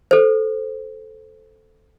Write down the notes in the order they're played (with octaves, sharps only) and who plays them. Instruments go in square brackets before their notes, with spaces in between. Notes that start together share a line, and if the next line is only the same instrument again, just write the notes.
[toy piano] A4 C5